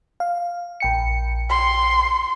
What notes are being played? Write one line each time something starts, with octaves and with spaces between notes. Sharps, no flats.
F5
A#1 G5 C#7
C6